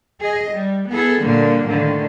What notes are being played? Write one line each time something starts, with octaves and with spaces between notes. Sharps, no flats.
G#4 D#5
G3
B3 E4 G#4 A4
A#2 D3 F#3 G3 A#3
A2 D3 D#3